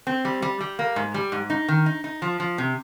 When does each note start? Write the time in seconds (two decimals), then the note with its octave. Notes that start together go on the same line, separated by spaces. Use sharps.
0.07 C4
0.25 G3
0.42 G3
0.60 G3
0.79 A#3
0.96 G#2
1.14 G3
1.32 G#2
1.50 D#4
1.68 D#3
1.86 D#4
2.04 D#4
2.22 F3
2.40 F3
2.58 C3